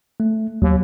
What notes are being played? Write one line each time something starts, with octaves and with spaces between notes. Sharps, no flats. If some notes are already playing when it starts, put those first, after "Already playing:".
A3
D#2 F#3